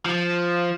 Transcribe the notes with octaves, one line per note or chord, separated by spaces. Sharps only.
F3